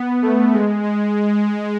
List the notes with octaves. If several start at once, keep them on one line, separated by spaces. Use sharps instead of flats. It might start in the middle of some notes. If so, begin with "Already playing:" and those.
Already playing: B3
A3
G#3
G#3